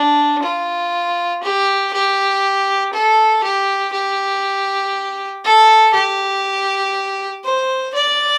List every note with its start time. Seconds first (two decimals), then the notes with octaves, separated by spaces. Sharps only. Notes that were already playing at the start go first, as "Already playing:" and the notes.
Already playing: D4
0.42 F4
1.43 G4
1.93 G4
2.93 A4
3.44 G4
3.93 G4
5.44 A4
5.93 G4
7.44 C5
7.94 D5